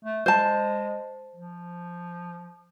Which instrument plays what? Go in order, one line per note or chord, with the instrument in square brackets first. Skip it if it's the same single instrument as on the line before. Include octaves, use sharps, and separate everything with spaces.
[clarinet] A3
[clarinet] G#3 [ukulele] C5 A5
[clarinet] F3